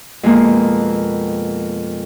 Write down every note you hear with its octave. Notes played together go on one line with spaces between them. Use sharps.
F2 B2 G#3 A#3 B3